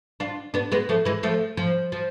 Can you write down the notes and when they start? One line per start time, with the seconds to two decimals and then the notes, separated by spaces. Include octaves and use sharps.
0.20 D4 F4
0.54 B3 D4
0.72 G#3 B3
0.89 F3 A3
1.05 E3 G#3
1.23 F3 A3
1.57 F3
1.92 F3